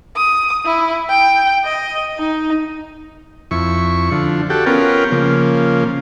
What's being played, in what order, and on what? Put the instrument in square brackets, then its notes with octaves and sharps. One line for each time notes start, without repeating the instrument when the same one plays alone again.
[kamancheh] D#6
E4
G5
D#5
D#4
[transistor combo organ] F2 E4 C#6
D3 F3
F#4 G4 A4
B3 C#4 F4 A#4 G5
C#3 F3 A#3